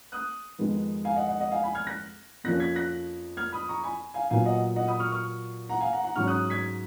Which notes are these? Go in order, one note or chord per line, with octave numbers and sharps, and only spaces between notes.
D#6 F#6
F2 D#3 G#3 B3
F5 G#5
D#5 F#5
D#5 F#5
D#5 F#5
F5 G#5
G#5 B5
F6 G#6
F#6 A#6
F2 F3 A#3 C#4 F#6 A#6
G#6 B6
F#6 A#6
F6 G#6
B5 D#6
A#5 C#6
G#5 B5
F5 G#5
A#2 F#3 B3 F5 G#5
D#5 F#5
D#5 F#5
B5 D#6
C#6 F6
C#6 F6
F#5 A#5
F5 G#5
F#5 A#5
F#5 A#5
G#2 F#3 C#4 C#6 F6
D#6 F#6
G#6 B6